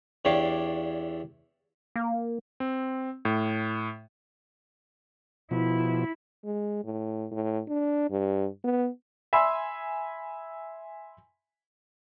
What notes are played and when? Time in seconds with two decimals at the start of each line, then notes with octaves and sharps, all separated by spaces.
0.25 E2 D4 G4 C#5 F5 D6
1.96 A#3
2.60 C4
3.25 A2
5.51 B2 F3 E4
6.45 G#3
6.84 A2
7.32 A2
7.68 D4
8.10 G2
8.64 B3
9.33 E5 G#5 B5 C6 E6